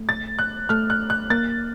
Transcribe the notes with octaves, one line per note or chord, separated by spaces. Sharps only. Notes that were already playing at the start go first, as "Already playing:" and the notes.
Already playing: A3
A6
F#6
A3 F6
F#6
F#6
A#3 A6